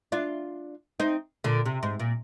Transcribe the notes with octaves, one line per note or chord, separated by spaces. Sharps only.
D4 F4
C4 D#4
A#2 D3
C3
G#2
A#2